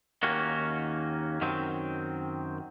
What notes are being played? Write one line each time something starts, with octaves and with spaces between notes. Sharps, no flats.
D#2 D#3 A#3 C#4 F#4
F#2 D#3 F#3 C4